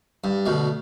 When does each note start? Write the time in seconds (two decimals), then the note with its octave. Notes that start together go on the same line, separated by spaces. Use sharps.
0.24 G2
0.46 D2 B2